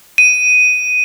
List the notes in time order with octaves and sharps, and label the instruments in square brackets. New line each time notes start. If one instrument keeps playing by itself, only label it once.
[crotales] D#7